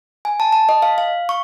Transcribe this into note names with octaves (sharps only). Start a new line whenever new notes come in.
G#5
A5
A5
D#5
F5
F5
C#6